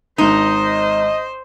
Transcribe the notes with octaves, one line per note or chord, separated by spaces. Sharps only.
G#1 D#4 C5 D#5 G7